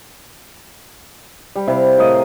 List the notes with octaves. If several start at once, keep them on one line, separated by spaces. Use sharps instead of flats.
G3
C3 E4 F5
A2 A#4 D#5 F5